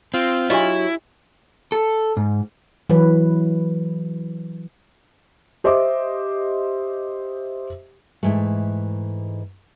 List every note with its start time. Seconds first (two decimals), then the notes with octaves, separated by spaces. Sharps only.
0.14 C4 F4
0.50 F#3 D4 E4 G4 D#5
1.72 A4
2.17 G#2
2.90 E3 F#3 B4
5.64 G4 C5 D#5 E5 D6
8.23 G#2 E3 A3